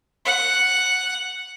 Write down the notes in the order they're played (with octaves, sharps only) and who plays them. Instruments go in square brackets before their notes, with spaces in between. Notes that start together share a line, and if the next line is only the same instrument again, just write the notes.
[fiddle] F#5